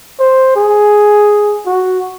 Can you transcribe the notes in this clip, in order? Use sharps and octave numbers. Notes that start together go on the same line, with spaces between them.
C5
G#4
F#4